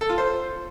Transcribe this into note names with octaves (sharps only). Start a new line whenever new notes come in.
A4
F4
C5